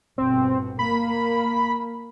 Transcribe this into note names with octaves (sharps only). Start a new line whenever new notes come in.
G1 B2 C4
A#3 B5